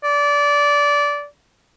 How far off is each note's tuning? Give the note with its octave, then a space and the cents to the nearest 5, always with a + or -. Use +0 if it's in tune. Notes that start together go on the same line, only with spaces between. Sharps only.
D5 -20